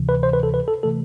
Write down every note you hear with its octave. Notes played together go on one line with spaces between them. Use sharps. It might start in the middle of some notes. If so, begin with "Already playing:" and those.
Already playing: D2 C3 E3
B4
C5
B4
A4
B4
A4
C3 E3 A3 A4